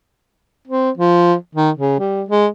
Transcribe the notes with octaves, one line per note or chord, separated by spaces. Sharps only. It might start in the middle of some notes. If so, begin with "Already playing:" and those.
C4
F3
D#3
C#3
G3
G#3